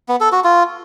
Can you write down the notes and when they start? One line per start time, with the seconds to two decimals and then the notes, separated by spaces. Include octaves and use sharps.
0.09 B3
0.20 A4
0.32 F#4
0.44 F4